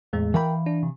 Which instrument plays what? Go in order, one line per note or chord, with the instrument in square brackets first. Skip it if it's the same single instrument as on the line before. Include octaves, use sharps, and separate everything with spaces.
[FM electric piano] E2 A2 G#3
[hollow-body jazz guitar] E3 F5 B5 [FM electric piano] A#4 G5
[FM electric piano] D4
C3